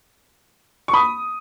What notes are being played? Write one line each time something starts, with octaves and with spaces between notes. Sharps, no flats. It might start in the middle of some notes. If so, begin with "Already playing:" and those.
C#6
B5 D#6